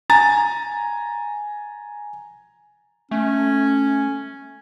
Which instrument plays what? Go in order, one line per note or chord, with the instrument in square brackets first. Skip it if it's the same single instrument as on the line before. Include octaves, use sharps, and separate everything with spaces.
[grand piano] G#5 A#5 A6
[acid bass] A3 [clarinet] C#4